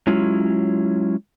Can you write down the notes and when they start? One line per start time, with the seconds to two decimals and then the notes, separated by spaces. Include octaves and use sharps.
0.07 F#3 G#3 C#4 E4 F4